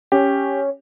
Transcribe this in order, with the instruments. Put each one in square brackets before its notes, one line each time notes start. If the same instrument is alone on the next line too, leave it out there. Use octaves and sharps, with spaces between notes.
[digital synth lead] C#4 [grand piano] G4